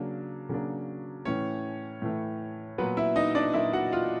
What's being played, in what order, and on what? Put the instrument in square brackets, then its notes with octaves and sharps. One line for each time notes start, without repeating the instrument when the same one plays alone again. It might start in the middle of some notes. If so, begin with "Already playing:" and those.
Already playing: [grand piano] C#3 F#3 A#3 D4
C#3 F#3 A#3 D4
A2 E3 A3 C#4 C#5
A2 E3 A3
A#2 F#3 A#3 B3 B4
E4 E5
D#4 D#5
D4 D5
A#2 F#3 A#3 E4 E5
F#4 F#5
F4 F5